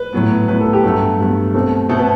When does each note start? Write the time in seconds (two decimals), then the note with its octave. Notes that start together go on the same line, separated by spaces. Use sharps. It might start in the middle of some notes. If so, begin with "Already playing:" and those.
Already playing: B4
0.13 A2 F#3 B3
0.48 A2 F#3 B3 B4
0.61 A4
0.73 G4
0.83 G2 F#3 A3 B3 A4
1.19 G2 F#3 B3
1.54 B2 A3 C4
1.89 B2 A3 C4 A4
1.99 B3 B4